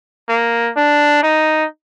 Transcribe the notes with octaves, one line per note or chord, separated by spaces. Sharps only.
A#3
D4
D#4